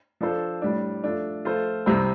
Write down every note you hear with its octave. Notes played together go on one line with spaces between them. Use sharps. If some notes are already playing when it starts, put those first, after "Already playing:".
F3 D4 A4 C5
A2 G3 D4
F3 A3 D4
F3 A3 F4 A4 C5
C2 C3 G3 C4